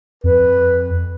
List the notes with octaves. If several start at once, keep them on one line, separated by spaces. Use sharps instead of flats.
F2 B4